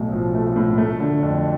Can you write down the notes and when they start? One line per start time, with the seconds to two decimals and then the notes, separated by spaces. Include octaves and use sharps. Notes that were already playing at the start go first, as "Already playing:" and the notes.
Already playing: B1 A2 A3
0.12 F3
0.34 A3
0.56 A2
0.78 A3
1.00 D3
1.23 F2